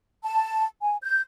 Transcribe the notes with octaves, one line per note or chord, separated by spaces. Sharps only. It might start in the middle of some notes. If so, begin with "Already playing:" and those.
A5
G#5
G6